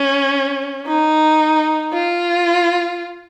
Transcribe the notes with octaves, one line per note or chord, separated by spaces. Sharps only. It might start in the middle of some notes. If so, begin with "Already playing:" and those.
Already playing: C#4
D#4
F4